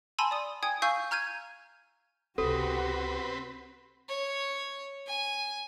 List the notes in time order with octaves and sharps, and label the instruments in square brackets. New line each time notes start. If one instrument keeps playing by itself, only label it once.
[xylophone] G#5 A5 B5 C6 E6 D#7
D5 D#6
G5 G#5 D#6 G#6
F5 G#5 C#6 E6 G6
A#5 F6 G6 G#6 D#7
[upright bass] C#2 C3 [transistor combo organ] C4 B4 [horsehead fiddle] F#4 G4 [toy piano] A4
[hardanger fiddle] C#5
G#5